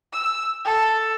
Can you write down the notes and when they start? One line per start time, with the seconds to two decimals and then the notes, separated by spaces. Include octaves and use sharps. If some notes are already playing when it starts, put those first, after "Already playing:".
0.13 E6
0.65 A4